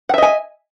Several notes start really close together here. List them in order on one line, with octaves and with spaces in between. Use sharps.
F#5 E5 D#5 G#5